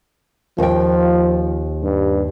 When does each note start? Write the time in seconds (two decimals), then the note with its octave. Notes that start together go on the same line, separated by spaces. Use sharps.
0.58 D#2 F3 G5
1.83 G2